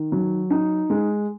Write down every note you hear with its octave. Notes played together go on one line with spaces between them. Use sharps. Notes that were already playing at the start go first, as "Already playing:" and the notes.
Already playing: D#3
F#3
D#4
G#3